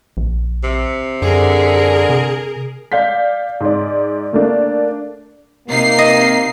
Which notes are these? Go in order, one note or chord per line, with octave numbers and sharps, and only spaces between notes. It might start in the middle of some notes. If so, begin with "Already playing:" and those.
A#1
C3
F#2 D3 G#4 A#4
C3
D5 F5 G6 B6
G#2 D5
A3 A#3 D4
C3 A#3 D#4 C7
D#5